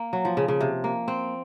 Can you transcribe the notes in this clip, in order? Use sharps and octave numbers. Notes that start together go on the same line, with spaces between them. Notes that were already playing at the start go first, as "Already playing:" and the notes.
Already playing: A#3
F#3
F3
C#3
C#3
C3
A#3
C4